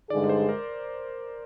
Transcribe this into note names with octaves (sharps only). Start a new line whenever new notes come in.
G2 D3 G#3 D#4 G#4 D5
D5
C5
A#4